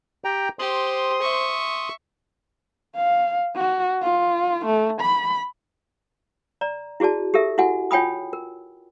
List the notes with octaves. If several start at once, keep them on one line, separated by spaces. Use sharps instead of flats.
G4 G5 A#5
G4 C5 C6 D#6
E5 C#6
F5
F#4
F4
A3
B5
D5 A#5
E4 F#4 G#4 D5 A5
G4 A4 A#4 E5
E4 F#4 F#5 G#5
F4 C#5 G5 G#5 B5 D#6
A#4